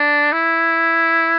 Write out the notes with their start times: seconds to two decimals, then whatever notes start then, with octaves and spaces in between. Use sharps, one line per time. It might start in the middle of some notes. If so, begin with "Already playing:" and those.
Already playing: D4
0.32 E4